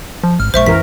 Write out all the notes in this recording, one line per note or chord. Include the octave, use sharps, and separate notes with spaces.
F3
G#1 F6
A#1 G#3 C5 E5 C#6
F#2 E3 A#4 B6